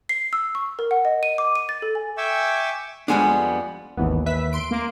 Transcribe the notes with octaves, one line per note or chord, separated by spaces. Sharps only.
C7
E6
C#6
A#4
F#5
D#5
D#7
D6
D#7
A6
A4
G#5
E5 G5 G#5 C#6 D6 E6
F2 E3 G3 G#3 B3 D4
G#1 D#2 E3 B3
B4 E5 B6
C6 D7
A#3